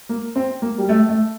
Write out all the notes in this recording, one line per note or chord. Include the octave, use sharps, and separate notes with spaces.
A#3
C4
A#3
G3
A3
A3